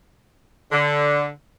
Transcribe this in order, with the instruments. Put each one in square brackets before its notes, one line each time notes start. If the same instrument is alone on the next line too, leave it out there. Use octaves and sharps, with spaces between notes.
[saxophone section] D3